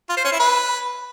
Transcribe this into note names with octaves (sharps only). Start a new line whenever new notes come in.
F4
C5
C#4
E4
B4